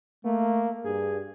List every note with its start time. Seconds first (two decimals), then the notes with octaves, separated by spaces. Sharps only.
0.25 A3 A#3
0.85 G2 G#4